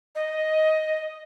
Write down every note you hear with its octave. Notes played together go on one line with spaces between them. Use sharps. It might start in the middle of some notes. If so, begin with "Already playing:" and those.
D#5